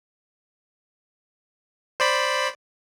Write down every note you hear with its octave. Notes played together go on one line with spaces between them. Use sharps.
C5 D5 B5